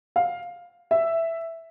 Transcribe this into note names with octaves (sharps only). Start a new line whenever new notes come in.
F5
E5